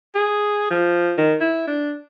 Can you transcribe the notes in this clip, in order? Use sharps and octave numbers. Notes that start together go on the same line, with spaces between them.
G#4
F3
D#3
E4
D4